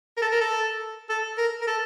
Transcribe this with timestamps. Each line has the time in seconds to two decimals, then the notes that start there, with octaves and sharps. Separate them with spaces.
0.17 A#4
0.22 A4
0.32 A#4
0.41 A4
1.09 A4
1.38 A#4
1.62 A#4
1.67 A4